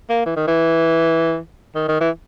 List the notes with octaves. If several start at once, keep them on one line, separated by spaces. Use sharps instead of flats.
A#3
E3
D#3
E3
D#3
D#3
E3